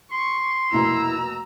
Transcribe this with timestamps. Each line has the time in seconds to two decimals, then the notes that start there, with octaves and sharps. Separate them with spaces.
0.12 C6 C#6
0.72 F1 B2 A#3 E4 A#5 E6